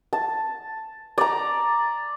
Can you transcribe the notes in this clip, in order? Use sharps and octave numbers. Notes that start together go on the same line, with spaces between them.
A5
D5 A#5